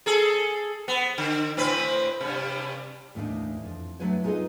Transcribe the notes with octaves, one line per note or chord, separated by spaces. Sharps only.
G#4 A4
B3
D3
A2 C4 B4
G2 C3
D#2 A2 E3 G3 D4 D#4
F2
F#3 A3 D4 E4 B4 C#5
D#4 F4 G#4 A4 B4 D#5